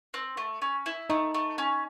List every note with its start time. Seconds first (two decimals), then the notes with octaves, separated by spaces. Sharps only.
0.14 C4
0.37 A3
0.62 C#4
0.86 E4
1.10 A3 D#4
1.34 A3
1.58 C#4